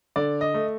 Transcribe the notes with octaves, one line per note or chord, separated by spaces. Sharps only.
D3 D5
D#5
A3